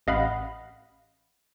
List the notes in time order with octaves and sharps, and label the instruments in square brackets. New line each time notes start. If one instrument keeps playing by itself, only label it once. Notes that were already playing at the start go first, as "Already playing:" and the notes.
[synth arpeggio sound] A1 D#5 F5 F#5 B5